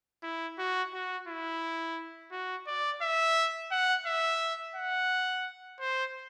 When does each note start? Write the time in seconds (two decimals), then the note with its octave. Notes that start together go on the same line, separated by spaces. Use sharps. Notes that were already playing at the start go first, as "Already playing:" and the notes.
0.23 E4
0.58 F#4
0.93 F#4
1.28 E4
2.31 F#4
2.67 D5
3.02 E5
3.71 F#5
4.06 E5
4.75 F#5
5.80 C5